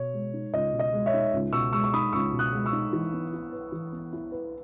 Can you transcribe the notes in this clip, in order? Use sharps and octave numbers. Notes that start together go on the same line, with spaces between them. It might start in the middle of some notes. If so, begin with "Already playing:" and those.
Already playing: B2 C#5
G#3
D#4
C#2 D#5
B2
D#5
G#3
C#5 E5
D#4
C#2
B2 C#6 E6
G#3 C#6 E6
C#6
D#4 B5 D#6
C#2 C#6 E6
B2
D#6 F#6
G#3
C#6 E6
D#4
E3
B3
E4
B4
E3
B3
E4
B4